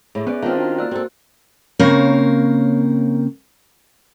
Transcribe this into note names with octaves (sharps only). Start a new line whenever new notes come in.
A2 G#4 C#5 E5
B3 C#4 B4 D5
D#3 C4 C#4 F4 F5 A5
D4 F#4 A#5
A#3 D5 E6 F#6
C4 F#4 A4 A#4
C#3 A#3 C4 A#4 C#5 F5